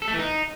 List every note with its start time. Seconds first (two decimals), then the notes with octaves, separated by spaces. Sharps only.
0.02 A4
0.08 A3
0.13 E3
0.19 D#4